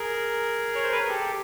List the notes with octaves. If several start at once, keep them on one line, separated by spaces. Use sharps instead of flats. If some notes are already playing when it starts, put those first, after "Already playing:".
Already playing: G#4 A#4
C#5
C5
B4
A#4
G4 A4